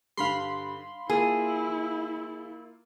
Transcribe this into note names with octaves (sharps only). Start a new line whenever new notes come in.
G2 D3 G3 F5 B5 C6
A#3 E4 F4 G#4